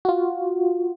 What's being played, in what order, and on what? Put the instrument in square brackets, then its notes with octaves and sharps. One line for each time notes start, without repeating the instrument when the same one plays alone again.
[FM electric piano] F4 F#4